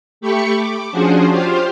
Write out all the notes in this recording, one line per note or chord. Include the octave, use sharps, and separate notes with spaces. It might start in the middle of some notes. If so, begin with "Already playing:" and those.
A3 G4 B5 C#6 C#7
D6
F3 C#4 D4 F#4 G#4 C5
F4 G4 C5 F5